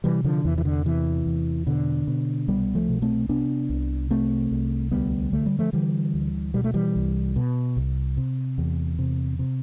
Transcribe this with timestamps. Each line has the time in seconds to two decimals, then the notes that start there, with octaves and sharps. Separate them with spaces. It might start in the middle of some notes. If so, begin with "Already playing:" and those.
0.04 C3 E3 G3
0.24 D3 F3
0.45 E2 E3
0.58 E3
0.65 D3
0.85 C3 E3
1.26 E2
1.67 B2 D3
2.07 B2
2.48 C2 G3 B3
2.75 F3 A3
2.89 B2
3.02 A3 C4
3.29 C3 B3 D4
3.70 C2
4.11 C3 A3 C4
4.51 C2
4.91 D2 G3 B3
5.33 D3 A3
5.46 G3
5.59 F3 A3
5.73 D3 E3 G3
6.14 D2
6.54 B2 G3
6.64 A3
6.74 E3 G3
6.96 C2
7.36 B2
7.77 C2
8.17 C3
8.58 E2
8.99 C3
9.39 C3